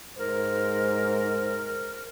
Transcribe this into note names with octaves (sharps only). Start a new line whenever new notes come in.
G#2 A#4 C5